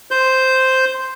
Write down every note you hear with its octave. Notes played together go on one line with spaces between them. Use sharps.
C5 G6